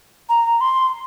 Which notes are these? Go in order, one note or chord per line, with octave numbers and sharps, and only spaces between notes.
A#5
C6